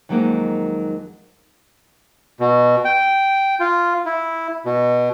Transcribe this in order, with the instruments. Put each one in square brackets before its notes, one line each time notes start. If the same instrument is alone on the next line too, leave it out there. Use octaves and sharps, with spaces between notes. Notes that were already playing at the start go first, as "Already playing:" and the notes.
[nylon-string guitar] F2 D#3 F#3 G#3 A#3 D#4
[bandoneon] B2
G5
F4
E4
B2